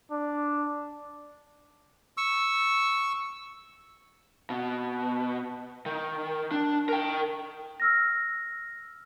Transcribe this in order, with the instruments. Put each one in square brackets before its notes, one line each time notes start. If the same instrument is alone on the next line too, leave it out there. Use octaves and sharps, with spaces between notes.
[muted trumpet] D4
[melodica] C#6 E6
[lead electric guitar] B2
D#3
D4
A#4 G5
[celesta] E6 F6 A#6